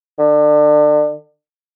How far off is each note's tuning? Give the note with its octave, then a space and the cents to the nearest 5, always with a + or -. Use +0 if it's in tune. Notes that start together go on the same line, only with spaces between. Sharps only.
D3 +30